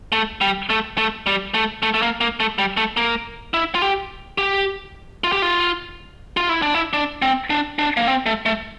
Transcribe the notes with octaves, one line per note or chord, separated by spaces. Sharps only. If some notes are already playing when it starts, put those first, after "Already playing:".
A3
G3
A3
A3
G3
A3
A3
A3
A#3
A#3
A3
G3
A3
A#3
E4
F4
G4
G4
F4
G4
F4
F4
E4
D4
E4
D4
C4
D4
D4
A#3
C4
A3
A3